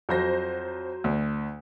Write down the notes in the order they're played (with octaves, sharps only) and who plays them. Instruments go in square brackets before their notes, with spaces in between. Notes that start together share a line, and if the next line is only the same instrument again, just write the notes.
[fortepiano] F2 [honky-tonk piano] F#3 C5 A#6
[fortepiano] D2